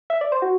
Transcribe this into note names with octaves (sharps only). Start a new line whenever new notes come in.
E5
D5
C5
F#4